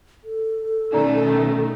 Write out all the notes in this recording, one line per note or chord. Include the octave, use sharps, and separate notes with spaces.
A4
B2 D#3 A3 C#4 D#4 D5 A#5